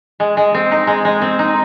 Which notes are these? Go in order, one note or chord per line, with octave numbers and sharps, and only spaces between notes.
G#3
G#3
C4
D#4
G#3
G#3
C4
D#4